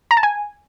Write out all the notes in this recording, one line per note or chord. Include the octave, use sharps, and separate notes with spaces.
A#5
A5
G#5